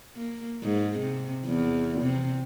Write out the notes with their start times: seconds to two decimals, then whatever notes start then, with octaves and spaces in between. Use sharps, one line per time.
0.16 A#3
0.64 G#2
0.99 C3
1.45 E2
2.01 C3